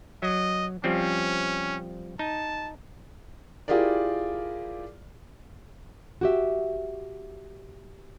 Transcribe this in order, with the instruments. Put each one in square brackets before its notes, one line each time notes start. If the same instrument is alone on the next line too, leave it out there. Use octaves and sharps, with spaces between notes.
[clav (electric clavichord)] F#3 [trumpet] D#5
[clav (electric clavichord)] F3 G3 C4 [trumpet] C#4
[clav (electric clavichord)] D#4 [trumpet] A5
[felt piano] E4 F4 G4 G#4 A#4 D5
[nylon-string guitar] F#4 G4 E5